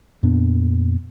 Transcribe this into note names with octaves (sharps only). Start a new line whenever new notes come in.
F2 A#2 B3 D4